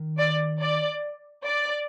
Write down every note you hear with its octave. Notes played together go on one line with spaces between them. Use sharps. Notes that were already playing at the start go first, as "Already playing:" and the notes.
Already playing: D#3
D5
D5
D5